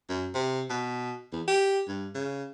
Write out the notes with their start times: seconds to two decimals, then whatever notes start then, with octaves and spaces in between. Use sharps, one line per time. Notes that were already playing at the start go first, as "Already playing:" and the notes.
0.09 F#2
0.34 C3
0.70 B2
1.33 E2
1.48 G4
1.88 G2
2.14 C#3